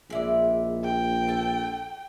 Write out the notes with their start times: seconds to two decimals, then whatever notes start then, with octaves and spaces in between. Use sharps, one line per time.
0.10 A#1 G#3 E4 D5
0.84 G5
1.28 A4 A5